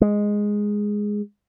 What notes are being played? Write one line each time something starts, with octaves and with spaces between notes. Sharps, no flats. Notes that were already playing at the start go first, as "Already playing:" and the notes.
G#3